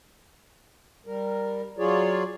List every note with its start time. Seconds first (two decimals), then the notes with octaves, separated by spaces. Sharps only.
1.07 G3 A#4
1.78 F#3 F4 G#4 C#5 D5